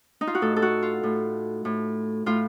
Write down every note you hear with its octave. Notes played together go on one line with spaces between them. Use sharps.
D#4
F4
F#4
A2 A4
A4
F#4
F4
A2
A2
A2 F4